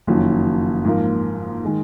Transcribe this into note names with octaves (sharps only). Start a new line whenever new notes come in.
F#1 F2 D#3 F#3 C#4
G#2 F3 A#3
D#3 G#3